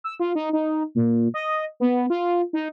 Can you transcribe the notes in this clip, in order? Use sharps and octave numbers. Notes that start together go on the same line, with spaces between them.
E6
F4
D#4
D#4
A#2
D#5
B3
F4
D#4